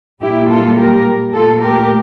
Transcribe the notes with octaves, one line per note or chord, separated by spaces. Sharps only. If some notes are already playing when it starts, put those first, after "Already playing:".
A#2 G3 A#3 E4 G4
F4 A4
G4 A#4
A#2 A3 F4 A4
G4 A#4